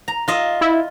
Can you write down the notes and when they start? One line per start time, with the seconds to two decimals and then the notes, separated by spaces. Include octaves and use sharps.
0.08 A#5
0.28 F4 D#5 E5
0.61 E4